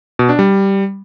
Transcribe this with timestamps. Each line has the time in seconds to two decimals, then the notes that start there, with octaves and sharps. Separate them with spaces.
0.19 B2
0.29 D4
0.39 G3